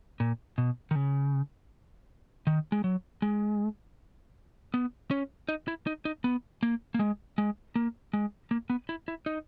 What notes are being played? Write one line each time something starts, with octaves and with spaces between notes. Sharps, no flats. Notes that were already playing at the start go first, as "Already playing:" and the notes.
A#2
B2
D#3
C#3
D#3
G#3
F#3
G#3
B3
C#4
D#4
E4
D#4
D#4
B3
A#3
A#3
G#3
G#3
A#3
G#3
A#3
B3
E4
E4
D#4